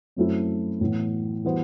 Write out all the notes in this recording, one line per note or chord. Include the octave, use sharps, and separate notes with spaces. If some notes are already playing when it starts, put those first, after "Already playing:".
F#2 F#3 A3 C4 E4
A2 E3 B3
E3 G3 B3 F#4 C5